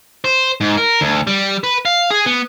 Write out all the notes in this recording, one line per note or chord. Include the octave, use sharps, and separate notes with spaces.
C5
G#2
A#4
D2
G3
B4
F5
G#4
B3